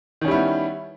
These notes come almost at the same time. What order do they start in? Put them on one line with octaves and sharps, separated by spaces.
D#3 C#4 G3 E4 B3